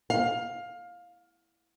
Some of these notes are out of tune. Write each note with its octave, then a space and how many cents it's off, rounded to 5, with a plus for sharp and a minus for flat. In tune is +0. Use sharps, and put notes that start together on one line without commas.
F5 +15